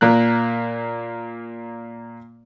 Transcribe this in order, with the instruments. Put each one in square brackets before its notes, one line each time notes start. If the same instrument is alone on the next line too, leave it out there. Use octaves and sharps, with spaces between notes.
[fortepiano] A#2 A#3 F#6